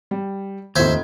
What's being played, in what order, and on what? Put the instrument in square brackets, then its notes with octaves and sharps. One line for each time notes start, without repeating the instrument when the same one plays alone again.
[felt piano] G3
[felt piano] F1 F4 G#6 [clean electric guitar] D#2 [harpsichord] C5 E5